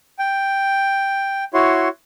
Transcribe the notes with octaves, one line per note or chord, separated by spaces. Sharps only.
G5
E4 F#4 C#5 C6